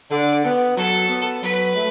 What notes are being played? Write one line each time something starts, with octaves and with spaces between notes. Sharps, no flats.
D3 D5
B3
F#3 A4
B3
F#3 B4
A3